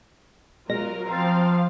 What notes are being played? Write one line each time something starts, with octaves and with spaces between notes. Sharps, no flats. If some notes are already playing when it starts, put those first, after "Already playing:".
B2 F#3 G#3 F4 A#4 A#6
F3 C4 F5 A#5 C6 A6